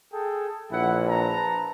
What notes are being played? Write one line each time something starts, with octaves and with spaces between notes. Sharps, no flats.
G#4 A4 G5
A#1 E4 F#5
B4 A5 A#5